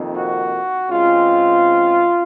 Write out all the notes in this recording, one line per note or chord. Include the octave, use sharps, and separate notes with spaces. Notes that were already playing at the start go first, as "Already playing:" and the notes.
Already playing: F2 C3 D#3 A#3
F#4
C#3 G#3 C4 F4